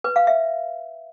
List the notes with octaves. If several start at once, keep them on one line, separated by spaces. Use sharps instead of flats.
B4
F5
E5